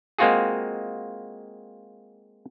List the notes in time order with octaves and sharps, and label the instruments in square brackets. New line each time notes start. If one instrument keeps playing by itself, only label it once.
[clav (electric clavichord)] G#3 A#3 C4 F4 F#4 G#4